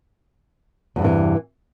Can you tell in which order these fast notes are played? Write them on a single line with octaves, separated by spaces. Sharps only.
E2 G2 C3 E3